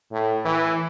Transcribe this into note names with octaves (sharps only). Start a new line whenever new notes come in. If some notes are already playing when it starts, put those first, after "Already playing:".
A2
E3